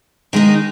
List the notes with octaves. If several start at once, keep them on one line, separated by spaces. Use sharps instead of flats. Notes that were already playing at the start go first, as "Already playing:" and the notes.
D#3 G#3 D#4